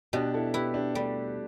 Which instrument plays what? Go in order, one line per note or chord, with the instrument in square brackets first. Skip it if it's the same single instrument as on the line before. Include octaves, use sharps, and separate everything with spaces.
[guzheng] B2 [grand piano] D4 G4
[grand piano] E4 A4
[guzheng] E4 [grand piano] G4 B4
[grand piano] D4 G4
[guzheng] G3 [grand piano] A3 D4